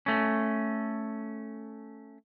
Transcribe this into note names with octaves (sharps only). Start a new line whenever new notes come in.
A3 C#4